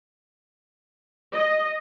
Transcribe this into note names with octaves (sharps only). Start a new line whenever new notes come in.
D#5